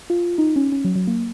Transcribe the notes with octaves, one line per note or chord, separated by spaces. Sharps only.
F4
D#4
C#4
C#4
F#3
F#3
A#3